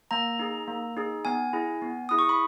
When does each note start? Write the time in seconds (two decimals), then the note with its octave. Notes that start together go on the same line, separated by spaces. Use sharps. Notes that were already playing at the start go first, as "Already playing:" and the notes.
0.11 A#3 A#5
0.39 D#4 G#4
0.68 A#3
0.97 D#4 G#4
1.25 B3 G#5
1.53 E4 G#4
1.82 B3
2.09 E4 G#4 D#6
2.19 C#6
2.29 B5